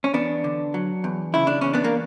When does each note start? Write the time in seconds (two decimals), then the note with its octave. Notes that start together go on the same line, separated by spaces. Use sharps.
0.04 C#4
0.13 E2 B3 D4
0.44 D3
0.74 F#3
1.04 E2
1.34 C#3 E4
1.47 D4
1.61 E2 C#4
1.73 B3 D4
1.84 A#3